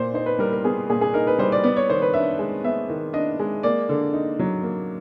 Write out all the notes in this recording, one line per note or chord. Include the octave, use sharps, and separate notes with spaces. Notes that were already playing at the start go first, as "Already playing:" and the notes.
Already playing: A#2 C5 D5
D#4 C5
B4
G3 A#4
A#4
B3 G#4
A#2 G#4
G#4
D#4 A#4
B4
G3 C5
D5
B3 D5
C#5
D#3 C5
B4
D4 E5
G#3
B3 E5
D#3
D4 D#5
G#3
A#3 D5
D3
D#4
F#3
A#3